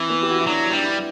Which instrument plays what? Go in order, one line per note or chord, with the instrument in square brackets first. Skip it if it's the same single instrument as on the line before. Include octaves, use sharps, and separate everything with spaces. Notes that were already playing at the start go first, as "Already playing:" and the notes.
Already playing: [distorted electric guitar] E3 [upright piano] C4
[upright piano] B3
G4
F#4
E4
[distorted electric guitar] F#3 [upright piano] D4
[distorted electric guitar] G3 [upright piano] D4
[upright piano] E4